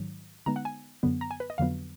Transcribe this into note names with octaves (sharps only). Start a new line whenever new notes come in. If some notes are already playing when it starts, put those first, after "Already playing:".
Already playing: G#2 D#3 F#3
D3 G#3 B3 D#4 A#5
F#5
G#5
F#2 D3 F#3 B3
A#5
G#5
B4
D#5
F2 D3 F#3 B3 F5